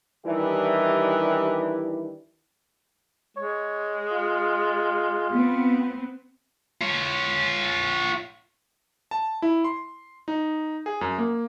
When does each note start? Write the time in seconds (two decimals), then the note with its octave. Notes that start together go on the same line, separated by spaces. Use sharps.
0.25 D#3 E3 G3 D4 E4 G4
3.37 G#3 C#5
4.12 F4
5.32 B3 C4
6.81 F4 C#5
9.11 A5
9.42 E4
9.64 C6
10.28 D#4
10.86 G#4
11.01 F#2
11.18 A#3